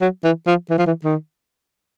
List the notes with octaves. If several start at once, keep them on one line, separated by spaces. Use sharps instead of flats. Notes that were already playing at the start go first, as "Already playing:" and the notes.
F#3
E3
F3
E3
F3
E3
D#3